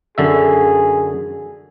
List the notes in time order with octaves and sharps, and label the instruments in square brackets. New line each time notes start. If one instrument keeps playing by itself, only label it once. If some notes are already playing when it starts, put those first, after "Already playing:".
[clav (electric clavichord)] F#2 D3 E5 [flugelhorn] G#4